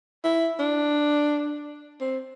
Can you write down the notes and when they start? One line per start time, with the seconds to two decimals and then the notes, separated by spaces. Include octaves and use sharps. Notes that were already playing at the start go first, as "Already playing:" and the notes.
0.24 E4
0.59 D4
2.01 C4